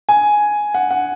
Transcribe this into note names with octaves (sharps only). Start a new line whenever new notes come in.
G#5
F#5
F#5